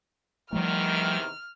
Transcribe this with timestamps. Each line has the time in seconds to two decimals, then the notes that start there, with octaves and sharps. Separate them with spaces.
0.53 E2 C3 D#3 F3 G3 A3 F6